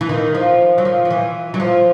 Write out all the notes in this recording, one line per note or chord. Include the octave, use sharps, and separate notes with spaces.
E3
D#3
F3
F#3
F3
F3
E3
F#3
F3